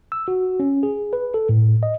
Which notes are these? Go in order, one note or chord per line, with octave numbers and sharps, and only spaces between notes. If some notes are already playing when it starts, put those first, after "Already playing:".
E6
F#4
C#4
G#4
B4
A4
A2
D#5